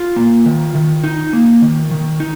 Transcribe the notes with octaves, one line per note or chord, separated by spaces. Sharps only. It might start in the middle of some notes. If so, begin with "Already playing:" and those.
Already playing: F4
A#3
D#3
D#3
D#4
A#3
D#3
D#3
D#4